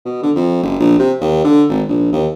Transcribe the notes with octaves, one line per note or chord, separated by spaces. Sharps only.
B2
D3
F2
F#1
A#1
C3
D#2
D3
G#1
A#1
D#2